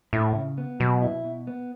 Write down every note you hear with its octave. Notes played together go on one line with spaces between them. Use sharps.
A2 E4
C#3
B3
B2 F#3
E4
B2
B3